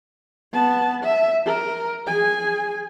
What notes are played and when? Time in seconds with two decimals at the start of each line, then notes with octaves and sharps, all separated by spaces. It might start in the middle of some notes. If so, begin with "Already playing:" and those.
0.52 B3 A5
1.03 E5
1.46 A#4
2.07 G#4 G#5